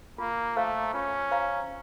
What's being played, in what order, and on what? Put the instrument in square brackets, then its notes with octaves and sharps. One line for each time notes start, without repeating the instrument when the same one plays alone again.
[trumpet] A#3 [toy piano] F4
[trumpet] A3 [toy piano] C5 F5 A#5 C#6
[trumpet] C#4 [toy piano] F4
[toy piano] C5 F5 A#5 C#6